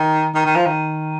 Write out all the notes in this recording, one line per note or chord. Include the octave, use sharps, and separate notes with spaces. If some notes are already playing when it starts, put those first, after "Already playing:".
Already playing: D#3
D#3
D#3
F3
D#3